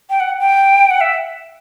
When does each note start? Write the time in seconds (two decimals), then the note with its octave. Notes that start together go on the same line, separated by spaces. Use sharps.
0.10 G5
0.20 F#5
0.40 G5
0.91 F#5
1.01 E5